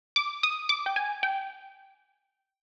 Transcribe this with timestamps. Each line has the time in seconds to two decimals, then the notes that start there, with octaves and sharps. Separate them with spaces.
0.16 D6
0.43 D#6
0.69 D6
0.86 G5
0.96 G#5
1.23 G5